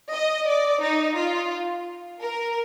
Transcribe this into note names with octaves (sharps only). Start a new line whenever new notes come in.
D#5
D5
D#4
F4
A#4